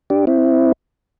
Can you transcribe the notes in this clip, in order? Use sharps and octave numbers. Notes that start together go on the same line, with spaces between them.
D4 G4
C4 E4